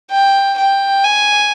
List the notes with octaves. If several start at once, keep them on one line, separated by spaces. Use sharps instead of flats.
G5
G5
G#5